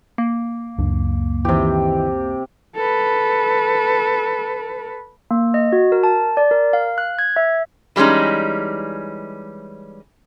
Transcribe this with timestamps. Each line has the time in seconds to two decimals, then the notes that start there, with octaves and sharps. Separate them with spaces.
0.18 A#3
0.78 C#2 F#2 D4
1.45 C3 D#3 E3 G4
2.76 A4 B4
5.31 A#3
5.54 D#5
5.73 F#4
5.92 A#4
6.03 A5
6.37 D5
6.51 A#4
6.73 F5
6.98 F#6
7.19 G#6
7.36 E5
7.96 E3 G3 G#3 C#4 D#4